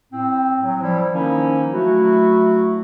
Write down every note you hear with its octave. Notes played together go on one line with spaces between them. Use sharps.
A2 C4
F#3
F3 G3 E4
D#3 F3 A#3 C#4 D#4 E4
F#3 A3 E4 F#4